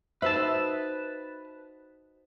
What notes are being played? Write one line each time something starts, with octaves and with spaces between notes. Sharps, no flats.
D#4 F#4 B4 C5 E5 A5